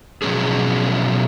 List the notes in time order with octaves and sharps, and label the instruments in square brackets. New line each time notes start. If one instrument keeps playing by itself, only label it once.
[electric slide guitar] B2 F3 F#3 G#3 C#4 G#4